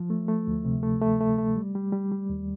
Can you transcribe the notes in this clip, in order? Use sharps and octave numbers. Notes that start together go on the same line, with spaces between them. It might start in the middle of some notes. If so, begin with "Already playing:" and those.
Already playing: F3
A3
A3
D2
C3
A3
A3
A3
A3
G3
G3
G3
G3
D#2